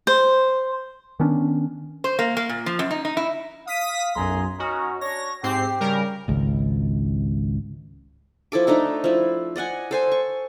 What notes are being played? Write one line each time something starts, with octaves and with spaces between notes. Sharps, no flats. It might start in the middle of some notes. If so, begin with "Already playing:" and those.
C5
D#3 B3 C#4 D4
C5
A#3
A#3
A#2
F3
F#2
D#4
D#4
E4
F5 D#6 B6 D#7
B1 F#2 G#4 A#5 C6
C#4 D#4 F#4 A#4
D4 C#5 A#6
G#2 C4 G4 C7
C#3 G3 A#4
G#1 C#2
F3 E4 A4 D6
A3 D4 D#4 A4
F3 E4
D5 D#5 F#5 G#5
A4 C5 G#5
C#6